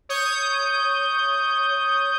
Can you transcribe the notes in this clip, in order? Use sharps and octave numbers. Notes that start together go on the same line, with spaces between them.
C#5 D#6 G6